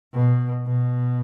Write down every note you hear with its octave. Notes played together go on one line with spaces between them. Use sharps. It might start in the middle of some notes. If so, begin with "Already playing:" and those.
B2
B2